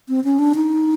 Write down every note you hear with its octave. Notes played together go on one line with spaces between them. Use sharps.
C4
C#4
D4
D#4